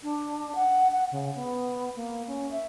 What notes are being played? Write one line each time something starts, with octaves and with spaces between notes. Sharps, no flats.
D4
F#5
F#5
C#3
B3
A#3
C#4
E5